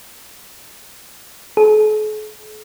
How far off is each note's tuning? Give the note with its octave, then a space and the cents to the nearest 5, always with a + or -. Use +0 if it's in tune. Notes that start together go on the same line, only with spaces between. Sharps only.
A4 -45